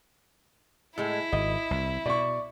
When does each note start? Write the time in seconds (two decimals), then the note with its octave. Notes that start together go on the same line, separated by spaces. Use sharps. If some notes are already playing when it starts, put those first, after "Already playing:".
0.98 A2 G#3 E4
1.32 G#1 D#5
1.71 C2
2.06 B2 D5 C#6